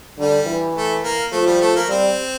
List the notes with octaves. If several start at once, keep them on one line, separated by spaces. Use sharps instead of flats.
D3 G3
E3
A3
A#3
F3 A3
G3
A3
A#3
G3 C4